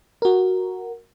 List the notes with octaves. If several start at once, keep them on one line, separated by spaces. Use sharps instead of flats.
F#4 A#4